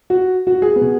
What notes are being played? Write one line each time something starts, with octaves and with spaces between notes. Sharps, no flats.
F#4
F#4
G#4
B3
B2